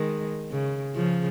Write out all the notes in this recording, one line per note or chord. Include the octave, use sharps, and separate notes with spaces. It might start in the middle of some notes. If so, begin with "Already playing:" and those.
Already playing: D#3 G#3
C#3
C#3 F3